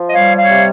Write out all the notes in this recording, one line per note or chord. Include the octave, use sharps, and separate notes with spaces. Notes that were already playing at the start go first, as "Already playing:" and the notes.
Already playing: F3
D#5
G3 C#5 F5
C#5 F5
C3